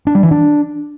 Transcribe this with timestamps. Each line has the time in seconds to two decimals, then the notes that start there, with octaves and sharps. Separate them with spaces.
0.07 D4
0.15 G3
0.23 E3
0.31 D4